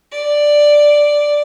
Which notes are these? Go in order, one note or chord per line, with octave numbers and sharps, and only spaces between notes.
D5